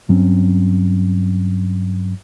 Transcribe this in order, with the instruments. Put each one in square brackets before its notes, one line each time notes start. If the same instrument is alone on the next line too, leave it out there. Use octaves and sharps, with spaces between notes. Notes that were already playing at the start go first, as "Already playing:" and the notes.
[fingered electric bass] G2 F#3 C4 C#4